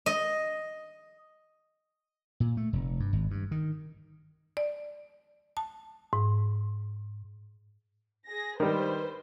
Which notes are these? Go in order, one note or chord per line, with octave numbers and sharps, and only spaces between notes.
D#5
A#2
A3
F1
G2
G#1
G2
D#3
D5
A5
G#2
G#4 A#6
D#3 G3 B4 C5